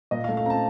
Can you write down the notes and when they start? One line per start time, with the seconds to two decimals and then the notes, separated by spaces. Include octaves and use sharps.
0.11 A#2 D#5
0.24 F5
0.28 A3
0.37 F5
0.46 C4 A#5
0.50 A5